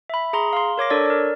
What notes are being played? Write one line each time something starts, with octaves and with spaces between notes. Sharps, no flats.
E5 B5
G#4 A#5 C6
F5 C6
A#4 C#5 D6 A#6
D4 A4 A#4 C#5 D5
A#4 D5